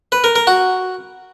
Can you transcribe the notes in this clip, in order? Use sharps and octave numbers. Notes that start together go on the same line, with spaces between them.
B4
A#4
A#4
F#4